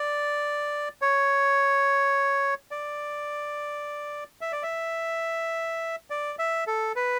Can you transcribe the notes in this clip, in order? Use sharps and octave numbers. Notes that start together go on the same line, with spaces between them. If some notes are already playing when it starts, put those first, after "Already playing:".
Already playing: D5
C#5
D5
E5
D5
E5
D5
E5
A4
B4